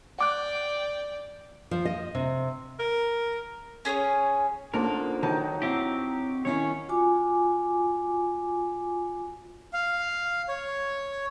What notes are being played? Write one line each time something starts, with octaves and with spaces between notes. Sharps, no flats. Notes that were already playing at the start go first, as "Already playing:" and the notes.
D5 F#5 G5 D6 F#6
F3
D#5
C3
A#4
C#4 G#4 A4 C#5
D3 F3 A#3 C#4 D#4 A#4
D#3 F#3 D#4 A5
C4 E4 G4 A#5
D#3 C#4 E4 C#5
F4 F#4 G#5 D6
F5
C#5